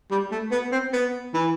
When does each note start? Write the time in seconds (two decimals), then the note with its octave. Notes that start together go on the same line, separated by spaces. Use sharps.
0.11 G3
0.31 A3
0.52 B3
0.72 C4
0.93 B3
1.34 E3